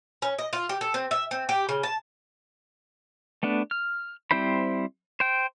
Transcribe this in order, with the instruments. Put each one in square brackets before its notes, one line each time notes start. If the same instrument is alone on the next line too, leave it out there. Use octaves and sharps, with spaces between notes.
[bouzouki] C#4
D#5
F4
G4
A4
C4
E5
C4
G4
C#3
A5
[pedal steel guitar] A3 B3 D4
F6
G3 C4 E4 C5 B5
C5 G5